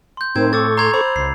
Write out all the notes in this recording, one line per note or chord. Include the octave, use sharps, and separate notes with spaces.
C6 G6
A2 C4 D#4 A#4 C5 G#6
A4 C#6 D6 E6 A6
A#5 C6 G#6 F7
C5 B5
C#2 C7